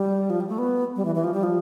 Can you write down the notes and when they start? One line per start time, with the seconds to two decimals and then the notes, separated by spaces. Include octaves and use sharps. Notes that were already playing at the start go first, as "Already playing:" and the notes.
Already playing: G3
0.30 F3
0.40 G3
0.49 A3
0.58 B3
0.96 G3
1.05 E3
1.15 E3
1.24 F3
1.34 G3
1.43 F3